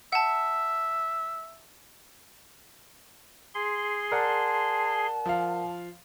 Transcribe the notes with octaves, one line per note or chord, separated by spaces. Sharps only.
E5 F#5 A5
G#4 C6
A#4 D5 F#5 A5
F3 F5